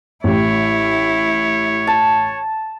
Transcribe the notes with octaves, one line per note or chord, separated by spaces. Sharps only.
A1 E4 G4 C#5
A5